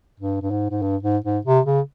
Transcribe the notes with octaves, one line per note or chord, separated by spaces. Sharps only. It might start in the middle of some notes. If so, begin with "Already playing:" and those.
G2
G2
G#2
G#2
G2
G#2
G#2
C3
C#3